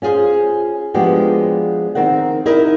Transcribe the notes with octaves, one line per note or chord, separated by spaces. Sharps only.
C#4 F4 G#4 C5
F3 G#3 B3 D4 F#4 G4
D#3 C4 A#4 F#5
D#4 E4 A#4 D#5